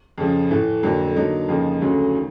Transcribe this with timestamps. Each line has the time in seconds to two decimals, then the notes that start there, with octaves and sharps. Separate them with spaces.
0.18 F2 C#3 F3
0.51 A2 E3 A3
0.83 F2 D3 F#3 A#3
1.16 D3 F#3 A#3 D#4
1.48 F2 C#3 F3 A#3 D#4
1.81 D2 C#3 F#3 A3
2.15 D#3